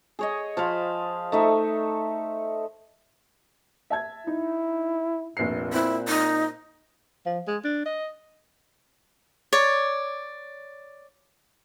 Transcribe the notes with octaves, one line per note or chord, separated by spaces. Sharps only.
G#4 C#5 D#5
F3 C5 F5 B5
A3 D#4 E5
E5 A5 G#6
D#4 E4
F1 A#1 A#2 C7
C4 E4 F#6
D#4
F3
G#3
D4
D#5
C#5 D5